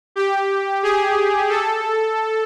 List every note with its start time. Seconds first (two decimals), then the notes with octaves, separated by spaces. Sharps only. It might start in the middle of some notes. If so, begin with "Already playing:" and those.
0.16 G4
0.83 G#4
1.49 A4